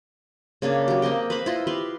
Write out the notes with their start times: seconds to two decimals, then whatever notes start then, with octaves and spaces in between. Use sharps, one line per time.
0.62 C#3 A#3 D4 G#4
0.88 F#3 G4
1.02 A#3 C4 D#5 G5
1.30 B4 C5 B5
1.46 E4 F4 D#5
1.67 G4 B4 C6